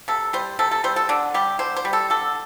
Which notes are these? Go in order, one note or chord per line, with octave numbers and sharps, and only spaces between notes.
C3 A4
G3 C5
C3 A4
A4
G3 C5
A4
D3 D4
G3 G4
D3 C5
C5
G3
A4
D3 A4